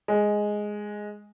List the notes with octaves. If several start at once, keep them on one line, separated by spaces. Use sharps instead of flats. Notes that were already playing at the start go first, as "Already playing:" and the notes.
G#3